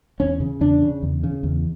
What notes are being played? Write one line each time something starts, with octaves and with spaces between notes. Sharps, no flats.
E2 C#4
C#3
E2 D4
C#3
E2
C#3
E2